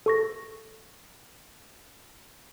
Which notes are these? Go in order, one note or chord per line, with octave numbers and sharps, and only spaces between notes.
A4 C#6 A#6